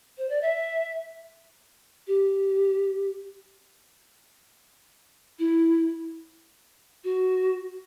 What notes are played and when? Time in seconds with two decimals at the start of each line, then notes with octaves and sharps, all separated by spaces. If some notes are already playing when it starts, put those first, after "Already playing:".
0.18 C5
0.29 D5
0.42 E5
2.07 G4
5.39 E4
7.04 F#4